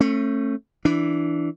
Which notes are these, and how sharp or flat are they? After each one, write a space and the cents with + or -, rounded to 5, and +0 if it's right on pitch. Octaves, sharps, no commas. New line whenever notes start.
A3 +15 C#4 -35
E3 +0 D4 +0